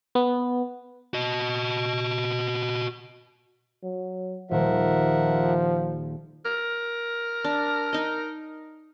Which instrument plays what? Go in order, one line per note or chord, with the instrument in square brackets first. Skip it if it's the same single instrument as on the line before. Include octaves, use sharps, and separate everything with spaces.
[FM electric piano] B3
[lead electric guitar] F#4 D#5
[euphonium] F#3
[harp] D#1 [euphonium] F3 [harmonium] A#4 E5 F#5
[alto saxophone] A#4
[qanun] D4
D#4 D#5